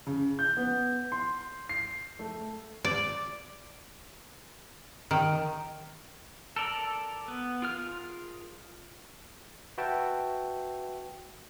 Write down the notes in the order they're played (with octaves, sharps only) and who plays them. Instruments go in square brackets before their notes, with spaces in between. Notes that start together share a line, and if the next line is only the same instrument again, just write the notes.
[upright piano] C#3
G6
B3
C6
C7
A3
[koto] D5
D#3
[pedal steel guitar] A4 A#4 D5
B3
F4 G#4 A#4 F5 F6
[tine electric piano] F#4 B4 E5 G5 A5